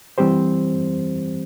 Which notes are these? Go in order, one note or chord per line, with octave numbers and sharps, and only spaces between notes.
E3 G3 C4 G4 C5